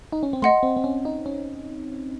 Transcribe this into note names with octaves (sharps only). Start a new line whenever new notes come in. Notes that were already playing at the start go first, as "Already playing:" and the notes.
D#4
C#4
C4
A3 D#5 F#5 C6
C4
C4
C#4
D#4
C#4